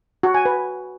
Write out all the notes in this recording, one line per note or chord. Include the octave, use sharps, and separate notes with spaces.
F#4
G#5
B4